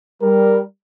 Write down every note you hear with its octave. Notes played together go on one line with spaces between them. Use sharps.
G3 A#4